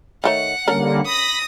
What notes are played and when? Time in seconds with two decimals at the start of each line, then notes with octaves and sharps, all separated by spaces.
0.24 D#3 A3 C#5 F#5
0.68 D3 G3 A#3 C#4 A4 A#4
1.05 B5 D#6 A#6